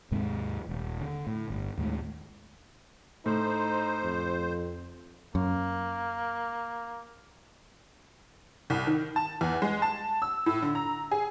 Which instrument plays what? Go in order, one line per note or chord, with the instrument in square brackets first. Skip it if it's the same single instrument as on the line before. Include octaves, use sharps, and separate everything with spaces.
[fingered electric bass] D#2 G#2 C3 G#3
D#1
D3
A2
G1
D#2 A2 G#3
[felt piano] A2 [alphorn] D#4 [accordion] C5
[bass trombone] F2
[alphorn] C4
[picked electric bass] F#2 [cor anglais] A#3
[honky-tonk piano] C2
D#3
A5
E2
G#3
A5
E6
A2
D3
A#5
G#4